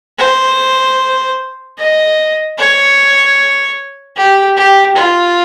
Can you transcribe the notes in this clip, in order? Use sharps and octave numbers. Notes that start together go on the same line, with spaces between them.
C5
D#5
C#5
G4
G4
F4